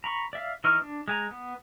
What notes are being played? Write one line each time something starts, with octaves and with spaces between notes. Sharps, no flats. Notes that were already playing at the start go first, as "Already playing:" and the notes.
A#5 B5 C#6
D5 E5 F5
E3 D#4 D#5 C#6 F6
D4
G#3 G#5 A#5
B3